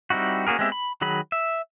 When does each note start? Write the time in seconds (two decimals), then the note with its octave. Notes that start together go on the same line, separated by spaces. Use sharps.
0.10 G3 C4 D#4 E4 F#4
0.47 A#3 C#4 F#4 G#4 A#4
0.59 G#3 B3 C4 G4 E5
0.72 B5
1.01 D#3 F#3 G#4 B5
1.32 E5